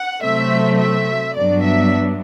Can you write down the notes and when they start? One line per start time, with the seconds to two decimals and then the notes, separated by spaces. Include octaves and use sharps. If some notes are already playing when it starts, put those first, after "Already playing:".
Already playing: F#5
0.23 C3 F#3 A3 C4 E5
0.79 E5
1.36 G2 F#3 B3 D4 D5
1.64 E5